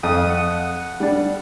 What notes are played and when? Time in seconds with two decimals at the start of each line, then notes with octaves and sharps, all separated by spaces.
0.03 F2 D#6
0.30 F#5
1.00 G3 D4